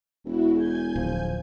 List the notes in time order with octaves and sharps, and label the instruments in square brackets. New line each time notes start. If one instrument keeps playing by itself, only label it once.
[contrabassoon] E1 [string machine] E4 F#4
[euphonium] G#4 [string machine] G#5 G6 G#6
[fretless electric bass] D1 [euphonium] F3